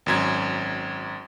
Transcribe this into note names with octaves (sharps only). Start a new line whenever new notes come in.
G#1 F#2 G#6